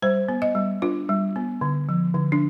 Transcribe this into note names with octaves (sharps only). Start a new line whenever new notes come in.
G3 C5
B3
D#5
G3
D4 F4
G3
B3
D3
F3
D3
D4